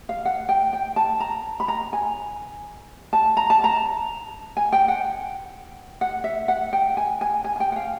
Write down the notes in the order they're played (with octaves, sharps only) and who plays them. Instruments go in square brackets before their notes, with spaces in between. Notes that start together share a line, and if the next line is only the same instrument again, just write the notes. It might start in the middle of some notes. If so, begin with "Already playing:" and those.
[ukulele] F5
F#5
G5
G5
A5
A#5
B5
A#5
G#5
A5
A#5
A5
A#5
G#5
G5
F#5
F#5
E5
F#5
G5
G#5
G#5
G#5
G#5
G5
F#5
F5